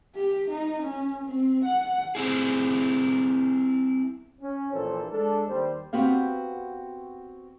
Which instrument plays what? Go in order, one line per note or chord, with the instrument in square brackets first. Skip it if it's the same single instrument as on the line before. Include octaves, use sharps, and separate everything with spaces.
[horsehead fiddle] G4
D#4
C#4
C4
F#5
[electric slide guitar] C4 E4 G#4
[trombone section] C#4
A#1 A#2 E3 A4 C5
G#3 D4 A4
D#2 G3 C5
[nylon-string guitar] B3 C4 F#4 G4 F5